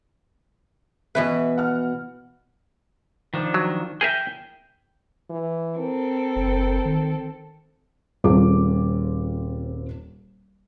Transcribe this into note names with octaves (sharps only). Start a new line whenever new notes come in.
B2 E3 B4 E5 F#6
F#5 F6
D#3 F3 D4
F#3
G#4 A#4 E5 G5
E3
C4 A4 A#4
F#1
D#3
D#1 C4 F4 G#4 A4 D6